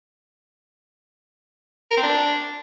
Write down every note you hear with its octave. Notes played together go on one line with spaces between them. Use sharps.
A#4
C4
D4